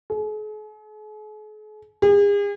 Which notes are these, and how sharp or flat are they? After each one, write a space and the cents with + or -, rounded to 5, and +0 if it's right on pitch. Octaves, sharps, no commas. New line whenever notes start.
G#4 +45
G#4 -40